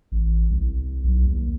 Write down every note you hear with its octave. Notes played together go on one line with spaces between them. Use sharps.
A1
C2
B1
D#2